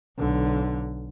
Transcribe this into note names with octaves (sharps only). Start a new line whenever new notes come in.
B1 D3